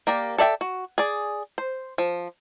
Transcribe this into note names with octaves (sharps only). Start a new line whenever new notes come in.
A#3 G4 A#4 D5
A4 D5 E5 G5
F#4
G#4 D5
C5
F3